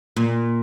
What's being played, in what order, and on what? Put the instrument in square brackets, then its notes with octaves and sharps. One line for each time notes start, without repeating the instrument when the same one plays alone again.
[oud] A#2